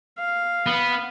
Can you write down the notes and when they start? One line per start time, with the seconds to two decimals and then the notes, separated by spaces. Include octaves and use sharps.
0.18 F5
0.66 B3